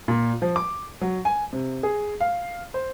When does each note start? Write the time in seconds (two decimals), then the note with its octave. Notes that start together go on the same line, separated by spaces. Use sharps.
0.08 A#2
0.42 F3
0.56 D6
1.01 F#3
1.25 G#5
1.53 C3
1.83 G#4
2.20 F5
2.74 C5